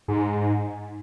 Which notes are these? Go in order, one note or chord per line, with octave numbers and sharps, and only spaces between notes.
G#2